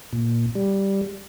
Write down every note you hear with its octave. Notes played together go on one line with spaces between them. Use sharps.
A#2
G3